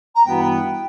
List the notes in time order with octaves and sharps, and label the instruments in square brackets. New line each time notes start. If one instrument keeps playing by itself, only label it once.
[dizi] A#5
[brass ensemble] G2 E3 B3 F#4 [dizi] G5